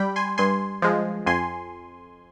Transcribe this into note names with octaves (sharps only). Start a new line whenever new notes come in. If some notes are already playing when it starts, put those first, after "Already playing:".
Already playing: G3 G5 B5
G#5 C6
G2 G#5 C6
F3 G#3
F2 G#5 C6